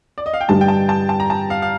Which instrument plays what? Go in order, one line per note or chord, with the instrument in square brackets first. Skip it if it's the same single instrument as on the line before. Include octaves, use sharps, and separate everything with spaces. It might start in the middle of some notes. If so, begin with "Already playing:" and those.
[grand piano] D5
D#5
F5
G5
[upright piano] G2 D3 G3 [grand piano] A5
[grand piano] G5
A5
A5
A5
A#5
A5
F5
F5